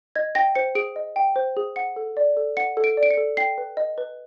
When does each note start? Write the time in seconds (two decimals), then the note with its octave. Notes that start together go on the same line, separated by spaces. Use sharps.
0.15 D#5 G#6
0.35 G5 A#6
0.55 C5 C#7
0.75 G#4 D7
0.96 D#5
1.16 G5
1.36 C5
1.57 G#4
1.76 F#5 C#7
1.96 A4
2.17 D5
2.37 A4
2.57 F#5 C#7
2.77 A4
2.84 D7
2.97 D5
3.03 D7
3.11 C#7
3.17 A4
3.37 G5 C7
3.58 B4
3.77 D#5
3.98 B4